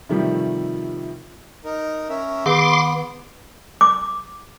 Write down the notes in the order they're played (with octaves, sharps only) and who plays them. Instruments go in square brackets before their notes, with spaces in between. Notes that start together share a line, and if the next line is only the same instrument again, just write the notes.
[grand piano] C3 D#3 F3 G3 A3
[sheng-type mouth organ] D#4 A#4
C#4 A#4 E5
[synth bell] D#3 [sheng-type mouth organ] B3 [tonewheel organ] C6 D6
[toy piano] D6